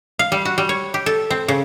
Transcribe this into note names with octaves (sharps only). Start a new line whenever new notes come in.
F5
G3
F#4
G3
C#5
G4
A4
C4
C#3